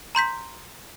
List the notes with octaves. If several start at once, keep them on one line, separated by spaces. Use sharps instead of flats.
A#5 C6 G6 B6